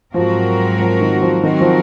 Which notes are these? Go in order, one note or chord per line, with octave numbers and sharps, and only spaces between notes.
G#2 F3 F#3 C4 F#4 A#4
F3
D#3
F3
D#3 F#3 C4 F#4 A#4
F3